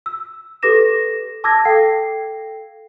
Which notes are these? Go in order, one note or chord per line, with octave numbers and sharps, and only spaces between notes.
E6
G4 A4 B4 D6 A#6 E7
A5 D6 E6 F6 G#6 A#6
A4 F5 G5 C7